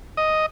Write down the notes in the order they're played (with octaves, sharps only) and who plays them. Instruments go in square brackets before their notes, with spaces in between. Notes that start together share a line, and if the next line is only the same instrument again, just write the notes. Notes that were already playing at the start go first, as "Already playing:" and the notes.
[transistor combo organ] D#5